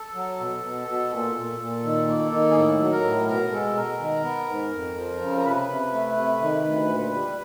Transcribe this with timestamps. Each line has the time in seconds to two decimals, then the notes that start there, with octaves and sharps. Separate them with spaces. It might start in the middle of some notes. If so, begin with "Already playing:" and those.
Already playing: A4
0.15 F#3
0.39 B2
0.63 B2
0.88 B2
1.11 A#2
1.36 A#2
1.60 A#2
1.84 D#3
2.08 A#3
2.32 D#3
2.51 G#4
2.56 A2 A4
2.80 F#3
2.92 A#4
3.04 A2
3.28 B2 A#4
3.52 G#3 A4
3.76 B2 A#4
4.00 D#3
4.24 B3
4.49 G#2
4.72 F2
4.97 F3
5.21 C#3
5.38 A#4
5.45 C3 B4
5.69 C3
5.92 A3
6.17 C3
6.41 D#3
6.65 D2
6.90 A#2
7.14 G3